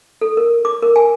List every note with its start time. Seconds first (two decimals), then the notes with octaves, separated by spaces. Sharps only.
0.21 A4
0.37 A#4
0.65 D6
0.82 A#4
0.96 G#5